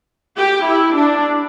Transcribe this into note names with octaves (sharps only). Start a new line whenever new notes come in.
G4
E4
D4